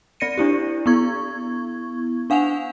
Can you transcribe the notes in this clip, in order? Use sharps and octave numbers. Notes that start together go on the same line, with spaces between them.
C4 D5 A#6 C#7 D#7
D4 E4 G4
B3 E4 C#6 G#6
D4 F5 F#5 G#5 F7